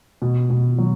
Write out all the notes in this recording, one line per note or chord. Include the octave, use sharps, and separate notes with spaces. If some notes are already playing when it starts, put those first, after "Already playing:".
B2
B2
F#3